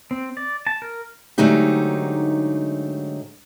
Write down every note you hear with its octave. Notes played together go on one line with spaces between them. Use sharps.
C4
D5
A5
A#4
G#2 D3 F#3 A3 D#4 G4